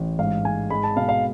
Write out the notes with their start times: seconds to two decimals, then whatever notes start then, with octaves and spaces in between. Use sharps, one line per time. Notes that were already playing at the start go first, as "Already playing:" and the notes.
Already playing: A1
0.19 G#2 F5
0.45 G#2 G#5
0.70 G#3 B5
0.83 A5
0.96 B2 F5
1.09 F5